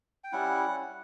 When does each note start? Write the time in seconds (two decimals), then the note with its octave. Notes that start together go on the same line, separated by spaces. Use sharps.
0.24 G5
0.33 G3 C#4 E4 F#5